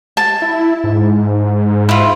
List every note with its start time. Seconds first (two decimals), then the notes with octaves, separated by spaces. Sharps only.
0.17 A5
0.42 E4
0.84 G#2
1.89 E4 F4